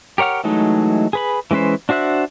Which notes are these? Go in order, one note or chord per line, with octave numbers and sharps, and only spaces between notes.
G4 A#4 C#5 F#5 F6
E3 F#3 G#3 A3 D#4
G#4 B4 B5
E3 G#3 C#4 B4 C5
D4 F#4 C5 E5 F#6